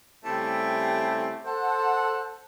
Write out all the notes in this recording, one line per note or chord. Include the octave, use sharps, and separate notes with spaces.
C#3 G3 A3 C4 E4 G4
A4 C5 F#5